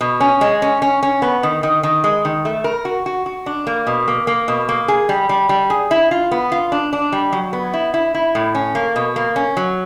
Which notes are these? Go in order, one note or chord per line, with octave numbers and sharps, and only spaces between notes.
B2
C#4
G#3
C#4
C#4
C#4
B3
D#3
D#3
D#3
G#3
D#3
A3
A#4
F#4
F#4
F#4
D4
A#3
B2
A#3
A#3
B2
A#3
G#4
G3
G3
G3
G#4
E4
F4
B3
F4
D4
D4
G3
F#3
B3
E4
E4
E4
A2
C#4
A#3
B2
A#3
C#4
F#3